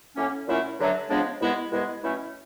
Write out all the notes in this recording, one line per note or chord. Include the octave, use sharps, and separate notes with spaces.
A2 F#3 A#3 C#4
A#2 F#3 A3 C#4 E4
G2 D3 F#3 A3
C#3 F3 G#3 B3 D4
C2 B2 G#3 B3 E4
C2 B2 G#3 B3 E4
B2 F#3 A3 C#4 E4